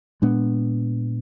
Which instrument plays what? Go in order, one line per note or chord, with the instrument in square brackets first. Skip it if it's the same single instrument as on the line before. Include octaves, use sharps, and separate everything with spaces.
[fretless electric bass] A#2 G#3 B3 D4